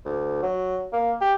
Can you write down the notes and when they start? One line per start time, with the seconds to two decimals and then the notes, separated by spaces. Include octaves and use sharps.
0.05 D2
0.43 F#3
0.93 A#3
1.21 G4